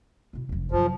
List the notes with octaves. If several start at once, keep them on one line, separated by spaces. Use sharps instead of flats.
B2 E4
F1 F2
F#2 C3 F3